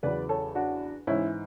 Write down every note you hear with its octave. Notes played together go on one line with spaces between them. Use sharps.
E2 C#3 F#3 B4 D5
A4 C#5
D4 F#4
G#2 E3 C#4 E4